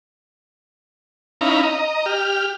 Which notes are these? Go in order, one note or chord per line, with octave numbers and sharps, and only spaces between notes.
C#4 D#4 E4 F5 A#5 B5
D#5 A#5
G4 F6